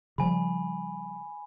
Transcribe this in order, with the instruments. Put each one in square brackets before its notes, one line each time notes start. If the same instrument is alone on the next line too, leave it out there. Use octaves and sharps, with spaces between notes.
[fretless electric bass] C#3 F3 G3 [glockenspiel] G#5 B5